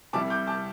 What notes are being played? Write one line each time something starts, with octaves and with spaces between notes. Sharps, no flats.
C2 C3 G3 E4 A5 D6
D6 G6
A5 D6